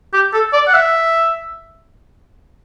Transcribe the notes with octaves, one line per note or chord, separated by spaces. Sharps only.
G4
A4
D5
F#5
E5